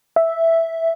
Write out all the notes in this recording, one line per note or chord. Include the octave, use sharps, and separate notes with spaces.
E5